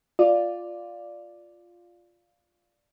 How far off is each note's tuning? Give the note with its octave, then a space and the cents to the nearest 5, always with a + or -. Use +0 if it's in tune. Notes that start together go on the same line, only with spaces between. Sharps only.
F4 +0 D5 +0